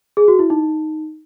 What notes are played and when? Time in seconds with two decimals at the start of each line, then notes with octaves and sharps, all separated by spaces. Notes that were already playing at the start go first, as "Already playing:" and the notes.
0.17 G#4
0.28 F#4
0.39 E4
0.50 D#4